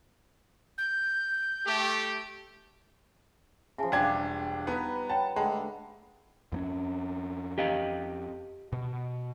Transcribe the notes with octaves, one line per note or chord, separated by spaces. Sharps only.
G6
A3 G4
C#3 F3 E5 G#5 A5
E1 G3 D4 F5 G5 G#6
B3 D#4 B4 A#5 D#6
C#5 F#5 G5 A5 B5
D3 G#3 A3 G5 A5 B5
F2 A#3 C#4
G4 D#5 F5
B2